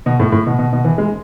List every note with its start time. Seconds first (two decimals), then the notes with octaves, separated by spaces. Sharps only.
0.06 B2
0.20 A2
0.32 A2
0.46 B2
0.59 B2
0.73 B2
0.84 E3
0.98 G#3